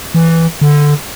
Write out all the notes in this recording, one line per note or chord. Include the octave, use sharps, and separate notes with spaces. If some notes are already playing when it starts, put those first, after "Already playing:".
E3
D3